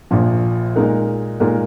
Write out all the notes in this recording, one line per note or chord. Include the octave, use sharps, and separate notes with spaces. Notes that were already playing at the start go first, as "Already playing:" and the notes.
A#1 A#2 F3
A#2 G#3 D#4 A#4
A#2 G#3 D#4 A#4